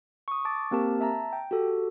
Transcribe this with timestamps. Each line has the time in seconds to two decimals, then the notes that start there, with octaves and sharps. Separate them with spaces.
0.28 C#6 D#6
0.45 A5 C#6 D6 A6
0.71 A#3 C4 G4 A#4 A5
1.01 E5 A5 A#5
1.33 G5
1.51 F#4 G4 A4